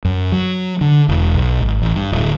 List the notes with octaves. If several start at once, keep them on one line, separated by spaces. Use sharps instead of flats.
F#2
F#3
D3
E1
B1
G#1
A1
G2
D1